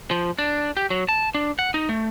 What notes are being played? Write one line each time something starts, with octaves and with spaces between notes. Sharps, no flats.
F3
D4
G4
F#3
A5
D4
F#5
D#4
A3